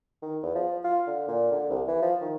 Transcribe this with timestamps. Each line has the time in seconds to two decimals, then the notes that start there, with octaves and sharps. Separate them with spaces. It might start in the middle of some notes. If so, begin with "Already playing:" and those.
0.22 D#3
0.43 E2
0.55 F3
0.84 F4
1.07 D3
1.28 A#2
1.51 D3
1.70 C2
1.88 E3
2.02 F3
2.21 D#3